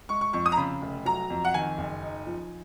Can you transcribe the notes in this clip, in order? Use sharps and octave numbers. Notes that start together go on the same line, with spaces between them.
G#3 C#6
C#6
F2 C#6
D#6
A#5
C#3 B5
F1
F#3 A#5
F2
F#5
D#3 G#5
F#1
D#4
F3